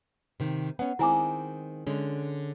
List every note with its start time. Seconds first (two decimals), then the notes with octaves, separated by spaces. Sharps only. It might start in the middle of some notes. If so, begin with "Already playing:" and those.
0.40 C3 D#3
0.79 B3 C#4 F#5
0.99 D#3 G#3 C4 E4 G#5 D6
1.87 D3 G#3 C#4